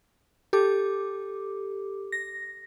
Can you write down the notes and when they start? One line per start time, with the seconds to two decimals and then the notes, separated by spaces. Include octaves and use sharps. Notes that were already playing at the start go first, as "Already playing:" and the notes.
0.53 G4 A4 D6
2.12 A#6